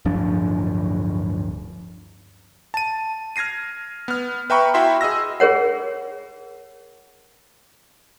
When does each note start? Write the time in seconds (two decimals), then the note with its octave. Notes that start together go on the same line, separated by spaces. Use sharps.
0.05 D1 G2 F3 D4
2.74 A5 D#7
3.36 F6 G#6 A#6 C7 D#7
4.08 B3 F6
4.50 B4 E5 G5 A#5 B5 C#6
4.74 E4 F#4 E5 G5 B5 C6
5.01 G#4 D#5 E6 A#6
5.40 G#4 A#4 C#5 F#5